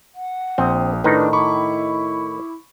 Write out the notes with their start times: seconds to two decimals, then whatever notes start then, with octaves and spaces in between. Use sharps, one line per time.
0.15 F#5
0.58 A#1 C4 D#6
1.04 A2 D#3 D4 D#4 B4
1.33 E4 B5 C#6 D6